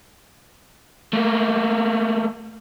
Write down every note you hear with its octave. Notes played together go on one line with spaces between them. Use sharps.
A3 A#3